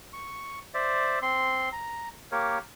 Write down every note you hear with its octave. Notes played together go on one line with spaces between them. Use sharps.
C#6
C5 D5 E5
C4 C6
A#5
A#3 G4 A#4 C#5